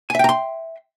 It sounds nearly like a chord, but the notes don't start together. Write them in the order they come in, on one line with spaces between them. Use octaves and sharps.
G#5 E5 G5 A#5 C6